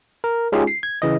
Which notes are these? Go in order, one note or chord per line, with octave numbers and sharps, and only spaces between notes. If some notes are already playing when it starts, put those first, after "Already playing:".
A#4
G#3 C#4 D#4 F4 G4 G#4
C7
G#6
C#3 E3 D#5